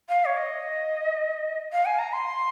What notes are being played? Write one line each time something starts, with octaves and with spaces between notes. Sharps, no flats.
F5
C#5
D#5
F5
G#5
A#5
C6